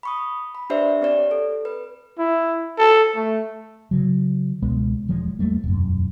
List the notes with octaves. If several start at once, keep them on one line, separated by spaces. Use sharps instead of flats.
B5 C#6 D#6
B5
D4 G4 B4 C5 D5 E5
C4 G4 C#5 D5
A4
B4
E4
A4
A3
C#3 F#3
C#2 B2 G#3 B3
E1 F3 G#3
E2 G3 A3 A#3
E1 F#2